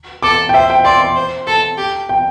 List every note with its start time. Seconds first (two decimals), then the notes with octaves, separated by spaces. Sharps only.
0.23 A4 D6
0.49 G5
0.54 C5 E5
0.70 G5
0.85 D5 C6
1.01 C6
1.16 C5
1.47 A4 A5
1.77 G4
2.09 G5